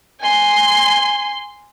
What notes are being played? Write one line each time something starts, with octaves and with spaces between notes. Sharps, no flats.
G#5 C6